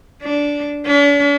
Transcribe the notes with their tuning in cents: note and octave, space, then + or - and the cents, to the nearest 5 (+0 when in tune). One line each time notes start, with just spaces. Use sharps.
D4 -15
D4 -45